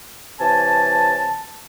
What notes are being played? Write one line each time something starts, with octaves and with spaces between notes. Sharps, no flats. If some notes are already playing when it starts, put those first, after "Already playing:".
C3 E3 C#5 G#5 A5